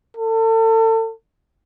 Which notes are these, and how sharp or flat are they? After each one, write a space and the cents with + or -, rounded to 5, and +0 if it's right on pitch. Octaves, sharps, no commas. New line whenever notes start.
A4 +35